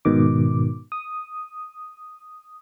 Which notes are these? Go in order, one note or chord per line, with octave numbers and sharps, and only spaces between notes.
G#2 B2 D#3 D6
D#6